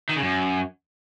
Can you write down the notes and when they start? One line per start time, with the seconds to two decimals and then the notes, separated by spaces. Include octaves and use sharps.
0.09 D#3
0.16 C#3
0.23 F#2